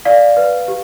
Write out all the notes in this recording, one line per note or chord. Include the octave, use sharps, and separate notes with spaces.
D5 F5
B4
G4